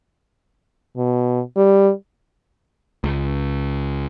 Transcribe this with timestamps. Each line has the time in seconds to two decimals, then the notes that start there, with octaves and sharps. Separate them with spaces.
0.97 B2
1.57 G3
3.04 C#2